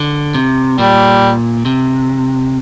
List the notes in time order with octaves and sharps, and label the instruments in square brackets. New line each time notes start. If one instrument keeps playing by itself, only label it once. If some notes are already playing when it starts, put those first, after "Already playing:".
Already playing: [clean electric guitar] D3
C3
[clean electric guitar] A#2 [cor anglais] G3
[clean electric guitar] C3